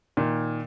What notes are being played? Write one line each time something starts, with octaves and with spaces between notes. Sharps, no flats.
A#2 D#3